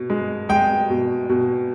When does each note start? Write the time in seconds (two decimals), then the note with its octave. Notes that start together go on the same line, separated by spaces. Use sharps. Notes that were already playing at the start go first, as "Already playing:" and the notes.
Already playing: B2
0.10 G#3
0.49 G#3 G5
0.90 B2
1.29 B2